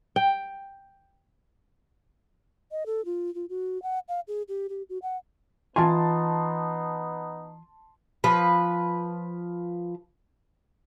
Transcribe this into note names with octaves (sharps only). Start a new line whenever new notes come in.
G5
D#5
A4
F4
F4
F#4
F#5
F5
G#4
G4
G4
F#4
F#5
E3 B3 D#4 F4 G#5 A5 C6
F3 B4